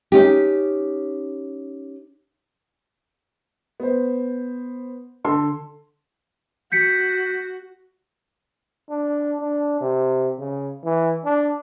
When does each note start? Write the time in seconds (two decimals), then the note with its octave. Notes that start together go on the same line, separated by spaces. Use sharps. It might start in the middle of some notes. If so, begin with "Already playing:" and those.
0.12 C#4 D#4 G4
3.80 B3 C5
5.25 D3 A4 C6
6.72 F#4 G6 B6 C#7
8.89 D4
9.40 D4
9.81 C3
10.39 C#3
10.84 E3
11.25 D4